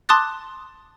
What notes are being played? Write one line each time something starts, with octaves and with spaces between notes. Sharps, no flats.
A5 C6 D6 D#6 F#6 A6